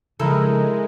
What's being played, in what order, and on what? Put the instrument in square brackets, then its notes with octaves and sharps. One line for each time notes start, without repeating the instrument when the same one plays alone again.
[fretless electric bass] C#3 F3 [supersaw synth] G#3 [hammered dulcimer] D#4 E4 A#4 [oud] A4